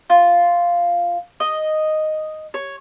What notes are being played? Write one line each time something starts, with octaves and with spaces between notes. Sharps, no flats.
F4
D#5
C#5